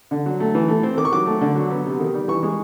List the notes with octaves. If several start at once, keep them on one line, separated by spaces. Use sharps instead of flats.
D3
F#3
A3
E3
A3
C4
D#3 D6
C#6
F#3 D6
A3
D3
F#3
B3
C3
D#3
G3
E3 C#6
G#3